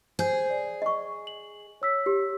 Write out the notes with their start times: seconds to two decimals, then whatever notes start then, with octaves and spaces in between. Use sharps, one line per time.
0.19 G#4 C5 G6
0.50 D5
0.82 D#5 C#6
1.27 F#7
1.82 C#5 E6 B6
2.06 G4